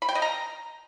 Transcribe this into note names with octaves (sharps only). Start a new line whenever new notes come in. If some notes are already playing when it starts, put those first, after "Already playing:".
B5
G5
D#5
A#5